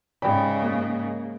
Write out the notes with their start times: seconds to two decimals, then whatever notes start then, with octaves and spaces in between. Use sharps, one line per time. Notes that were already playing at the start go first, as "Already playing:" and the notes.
0.22 G#2 C#3 D5 G5 B5
0.62 A#3